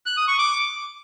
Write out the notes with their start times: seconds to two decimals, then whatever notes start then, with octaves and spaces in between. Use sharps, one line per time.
0.06 F#6
0.17 D#6
0.28 C#6
0.39 D6